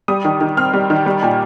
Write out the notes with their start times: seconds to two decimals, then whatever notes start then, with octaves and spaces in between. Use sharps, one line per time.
0.08 G3 D#6
0.25 D#3
0.41 D#3
0.57 C4 F6
0.73 G3
0.90 D#3
1.06 G3
1.23 A#2